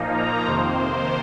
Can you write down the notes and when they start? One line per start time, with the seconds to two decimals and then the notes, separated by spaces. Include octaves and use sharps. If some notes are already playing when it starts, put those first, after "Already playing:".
Already playing: A#2 F3 A#3 D#4
0.14 A#5
0.47 F2 C3 D#3 A#3 C5